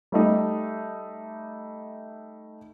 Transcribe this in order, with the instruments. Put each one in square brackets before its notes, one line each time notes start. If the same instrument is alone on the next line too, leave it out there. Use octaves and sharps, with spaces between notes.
[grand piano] G3 A3 D#4